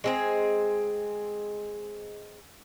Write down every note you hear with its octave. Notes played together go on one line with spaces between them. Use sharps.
G#3 C4 G#4